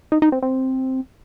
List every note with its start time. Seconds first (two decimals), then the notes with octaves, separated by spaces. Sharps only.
0.12 D#4
0.22 D#4
0.32 C4
0.42 C4